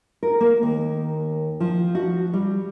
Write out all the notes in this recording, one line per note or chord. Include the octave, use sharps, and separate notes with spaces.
A#4
A#3
D#2
F3
F#4
G3